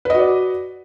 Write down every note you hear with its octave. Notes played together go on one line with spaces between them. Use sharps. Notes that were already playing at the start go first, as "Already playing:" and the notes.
F#4 B4 D5 D#5